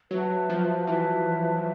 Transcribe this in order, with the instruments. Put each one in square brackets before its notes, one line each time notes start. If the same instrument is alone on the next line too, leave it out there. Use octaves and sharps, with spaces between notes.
[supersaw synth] F#3 [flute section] B4 E5 A5
[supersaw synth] F3
[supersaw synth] E3 [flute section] B4 E5 A5